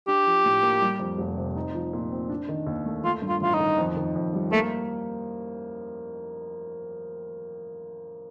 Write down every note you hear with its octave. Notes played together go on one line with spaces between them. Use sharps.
D4 G4
F3
A2
A#3
G3
F2
F1
C3
D#4
F3
A#2
C4
D4
D#3
D#2
A3
A3 F4
G2
F4
A1 F4
D#4
D#3
F2
D#3
F2
G3
A3 A#3